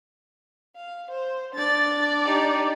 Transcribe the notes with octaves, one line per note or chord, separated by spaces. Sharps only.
F5
C5
D4 D5 A6
D#4 G4